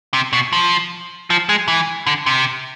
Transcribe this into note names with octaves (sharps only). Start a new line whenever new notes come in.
C3
B2
F3
F3
G#3
E3
D3
C3